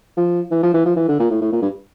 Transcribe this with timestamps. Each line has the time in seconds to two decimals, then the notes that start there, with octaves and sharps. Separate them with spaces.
0.17 F3
0.51 E3
0.63 F3
0.74 E3
0.85 F3
0.96 E3
1.08 D3
1.19 A#2
1.30 A2
1.41 A2
1.52 A#2
1.62 G2